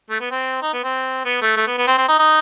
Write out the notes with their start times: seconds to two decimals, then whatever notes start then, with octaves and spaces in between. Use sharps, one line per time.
0.10 A3
0.21 B3
0.31 C4
0.62 D#4
0.73 B3
0.84 C4
1.25 B3
1.42 A3
1.57 A3
1.67 B3
1.78 B3
1.88 C4
1.98 C4
2.09 D#4
2.19 D#4